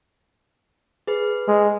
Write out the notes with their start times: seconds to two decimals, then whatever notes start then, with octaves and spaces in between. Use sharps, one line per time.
1.07 G#4 B4
1.48 G#3